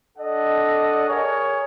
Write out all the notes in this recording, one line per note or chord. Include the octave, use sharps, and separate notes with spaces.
D4 A4 D#5 F#5
G#4 A#4 C#5